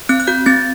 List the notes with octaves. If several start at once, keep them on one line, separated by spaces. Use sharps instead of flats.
C4 F#6
F#6
F#4 G6
C4 A6